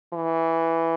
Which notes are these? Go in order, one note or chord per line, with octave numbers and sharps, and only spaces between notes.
E3